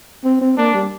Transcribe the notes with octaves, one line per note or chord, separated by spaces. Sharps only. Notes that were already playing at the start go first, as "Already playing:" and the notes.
C4
C4
A#3 D4
G3